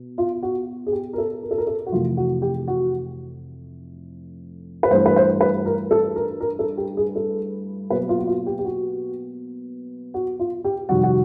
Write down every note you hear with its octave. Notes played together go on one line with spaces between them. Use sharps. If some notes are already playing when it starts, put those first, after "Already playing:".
Already playing: B2
F4
F#4
G#4
G4
A#4
A4
A#4
A4
A#4
A4
F#4
F2 C3 E3 A3 F4
F#4
G4
F#4
B4
G2 E3 A3 C5
B4
C5
B4
A#4
A4
A#4
A#4
A4
G4
G#4
A4
B2 F#3 A#3 B4
F4
F#4
F4
G4
G4
F#4
F#4
F4
G4
F2 C3 D#3 G3 F#4
F#4